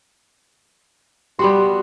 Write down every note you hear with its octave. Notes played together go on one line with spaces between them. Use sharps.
G3 B3 F#4 G4 C6